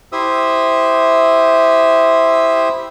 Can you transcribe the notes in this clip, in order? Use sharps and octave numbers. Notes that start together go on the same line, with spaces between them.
E4 G4 C5 E5 D#6 E6